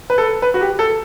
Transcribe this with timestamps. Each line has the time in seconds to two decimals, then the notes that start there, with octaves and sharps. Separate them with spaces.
0.10 B4
0.18 A4
0.42 B4
0.54 F#4
0.61 G4
0.79 A4